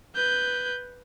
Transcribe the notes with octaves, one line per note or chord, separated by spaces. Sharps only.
B4 G6